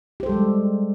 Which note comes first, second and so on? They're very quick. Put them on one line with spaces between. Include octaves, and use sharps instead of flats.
G4 C5 A4 G3 G#3